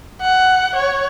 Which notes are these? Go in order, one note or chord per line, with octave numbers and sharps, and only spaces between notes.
F#5
C#5